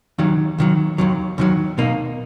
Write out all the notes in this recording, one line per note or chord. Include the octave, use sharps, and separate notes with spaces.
D#2 D#3 F#3
D#2 D#3 F#3
D#2 D#3 F#3
D#2 D#3 F#3
B2 A#3 D#4